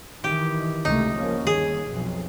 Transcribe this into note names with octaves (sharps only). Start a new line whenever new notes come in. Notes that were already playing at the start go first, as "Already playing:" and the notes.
D#3 E3 G4
C#2 C3 A3 D#4
F3 A#3 C#4
G1 D#2 G#4
B1 F2